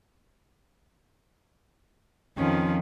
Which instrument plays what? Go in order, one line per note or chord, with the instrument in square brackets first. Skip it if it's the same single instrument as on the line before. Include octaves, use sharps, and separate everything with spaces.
[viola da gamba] F2 D#3 [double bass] F3 C#4